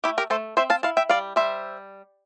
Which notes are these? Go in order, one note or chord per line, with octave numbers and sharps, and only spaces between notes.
A3 E4 G4
G4 A#4
A3 A4 C5
C4 C5 E5
F5 A5
E4 F5 A5
E5 G5
G3 D5 F5
G3 C5 E5